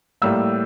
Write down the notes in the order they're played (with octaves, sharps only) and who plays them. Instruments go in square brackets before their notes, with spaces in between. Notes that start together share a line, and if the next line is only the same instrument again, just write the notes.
[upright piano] A2 G3 A#3 E6